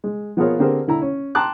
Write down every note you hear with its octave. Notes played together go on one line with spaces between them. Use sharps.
G#3
F3 B3 F4 G#4 A#4 C#5
D3 C4 G4 G#4 A#4 C5
D3 E4 A#5
C#4
G5 A5 A#5 C6 D6 F#6